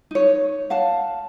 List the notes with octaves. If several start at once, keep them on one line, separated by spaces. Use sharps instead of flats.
D#4 C#5
F5 F#5 A5